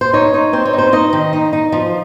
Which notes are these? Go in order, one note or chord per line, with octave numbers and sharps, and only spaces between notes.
C5
D#4 C#5
D#4
C4 C5
C#5
D#4
C5
D#4 D#5
D#3
D#4
D#4
F3